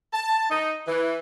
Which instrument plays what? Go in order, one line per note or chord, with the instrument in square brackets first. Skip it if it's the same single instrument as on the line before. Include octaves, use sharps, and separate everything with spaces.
[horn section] A5
D#4
E3